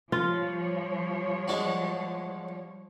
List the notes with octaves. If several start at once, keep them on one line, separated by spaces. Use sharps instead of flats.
F3 G3 F4 C#5
G#3 D4 F#4